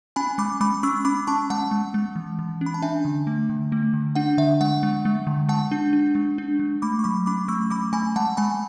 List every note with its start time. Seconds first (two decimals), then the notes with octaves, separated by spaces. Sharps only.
0.16 C#4 G#5 B5
0.38 G#3 B5 D6
0.61 G#3 B5 D6
0.83 C#4 C#6 E6
1.05 C#4 B5 D6
1.27 C#4 A5 C#6
1.50 G#3 F#5 A5
1.71 G#3
1.94 G#3
2.16 E3
2.39 E3
2.61 C#4
2.66 B5
2.74 A5
2.82 D4 E5 G#5
3.05 D3
3.27 A3
3.49 D3
3.72 A3
3.94 D3
4.15 D4 F#5
4.38 D3 E5
4.61 G#3 F#5
4.83 G#3
5.05 G#3
5.27 D3
5.49 G#3 F#5 A5
5.71 D4
5.93 D4
6.15 G#3
6.38 D4
6.59 G#3
6.82 A3 B5 D6
6.99 C#6
7.04 F#3 B5 D6
7.26 C#4 B5 D6
7.48 A3 C#6 E6
7.70 A3 B5 D6
7.93 A3 G#5 B5
8.16 G#3 F#5 A5
8.37 G#3 G#5 B5